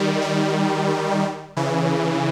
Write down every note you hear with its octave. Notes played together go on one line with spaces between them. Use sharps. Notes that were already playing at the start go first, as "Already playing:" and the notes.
Already playing: D#3 G3
D#3 G3
C#3 E3